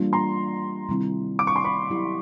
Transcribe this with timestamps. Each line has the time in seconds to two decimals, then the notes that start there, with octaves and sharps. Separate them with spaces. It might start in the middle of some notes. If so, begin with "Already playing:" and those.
Already playing: E3 G3 A#3 D4 F4
0.13 A#5 C6
0.89 C3 D#3 G3 C4 E4
1.39 D6
1.47 C#6
1.56 C6
1.64 B5 C#6
1.90 F#3 B3 E4 G4